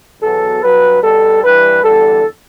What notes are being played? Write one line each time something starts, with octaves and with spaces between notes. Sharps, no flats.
E2 B2 F#3 A4
G2 F#3 B4
B2 G3 A4
G2 E3 G3 B4
E2 D3 G3 A4